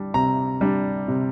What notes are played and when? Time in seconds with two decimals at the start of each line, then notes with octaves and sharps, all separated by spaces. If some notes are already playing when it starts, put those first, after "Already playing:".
Already playing: G3 D4
0.14 C3 A#5
0.61 G3 D4
1.08 C3